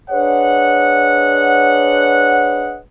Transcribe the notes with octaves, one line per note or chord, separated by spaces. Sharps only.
D4 G#4 B4 C#5 D#5 F#5